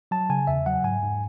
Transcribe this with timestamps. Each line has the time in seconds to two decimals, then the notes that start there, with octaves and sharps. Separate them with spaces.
0.11 F#3 A5
0.29 C#3 G#5
0.47 E2 E5
0.66 F#3 F#5
0.84 G#2 G#5
1.02 G#2